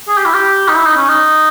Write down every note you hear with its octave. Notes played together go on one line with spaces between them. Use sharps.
G#4
G4
E4
G4
D#4
E4
D#4
C#4
D#4